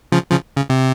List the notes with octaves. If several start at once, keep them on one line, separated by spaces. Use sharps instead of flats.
C#3 F3
C#3 F3
C#3
C3